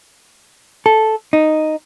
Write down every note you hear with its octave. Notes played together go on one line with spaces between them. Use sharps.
A4
D#4